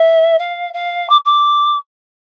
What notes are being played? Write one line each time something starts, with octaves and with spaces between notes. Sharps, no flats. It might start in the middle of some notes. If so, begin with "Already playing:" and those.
Already playing: E5
F5
F5
D6
D6